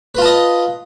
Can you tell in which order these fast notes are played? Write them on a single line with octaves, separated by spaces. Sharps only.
B4 F4 A5 D#5